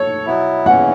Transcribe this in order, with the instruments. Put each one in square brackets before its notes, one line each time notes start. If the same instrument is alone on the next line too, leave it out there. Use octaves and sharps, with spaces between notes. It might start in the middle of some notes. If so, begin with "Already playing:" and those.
Already playing: [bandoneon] A4 [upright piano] C#5
[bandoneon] B2 F#3 B3 E4
[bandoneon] E2 C#3 E3 C#4 [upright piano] F#5